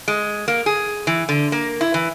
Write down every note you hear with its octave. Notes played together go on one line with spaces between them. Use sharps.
G#3
A#3
G#4
E3
D3
A#3
E4
E3